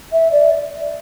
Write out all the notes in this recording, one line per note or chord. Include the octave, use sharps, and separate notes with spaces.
E5
D5